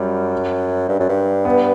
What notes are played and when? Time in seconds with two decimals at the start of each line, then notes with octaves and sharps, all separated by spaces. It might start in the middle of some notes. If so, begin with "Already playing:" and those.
Already playing: F#2 G3
0.88 G2
1.00 F#2
1.09 G2
1.45 B3